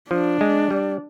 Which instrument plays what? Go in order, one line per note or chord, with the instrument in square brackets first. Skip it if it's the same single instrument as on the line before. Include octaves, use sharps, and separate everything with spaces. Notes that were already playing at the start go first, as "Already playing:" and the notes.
[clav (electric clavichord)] F3 [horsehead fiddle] D4
[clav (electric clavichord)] G#3
G3